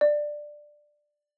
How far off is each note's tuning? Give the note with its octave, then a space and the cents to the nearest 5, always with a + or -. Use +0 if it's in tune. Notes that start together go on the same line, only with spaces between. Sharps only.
D5 +10